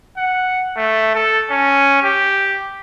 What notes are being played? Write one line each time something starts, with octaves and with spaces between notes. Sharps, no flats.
F#5
A3
A4
C#4
G4